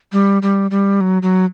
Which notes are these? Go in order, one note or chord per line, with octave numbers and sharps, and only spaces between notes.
G3
G3
G3
F#3
F#3